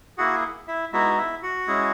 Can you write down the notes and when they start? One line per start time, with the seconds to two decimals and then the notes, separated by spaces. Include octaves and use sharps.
0.18 A#3 E4 F#4 G#4 F#5
0.68 E4 E5
0.92 G#3 B3 D#4 E4 F#4 E5
1.18 E4 E5
1.42 F#4 F#5
1.67 G#3 C#4 E4 G#4